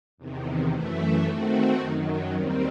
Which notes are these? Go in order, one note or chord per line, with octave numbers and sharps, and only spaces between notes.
E2 C3 D#3
F#2 E3 A3 E4
D#3 A3 C4 F#4
F#2 D#3 F#3
D#2 D#3 G3 C4